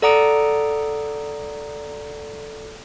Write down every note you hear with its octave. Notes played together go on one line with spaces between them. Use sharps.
A4 D5 F#5 A#5 D#6 D7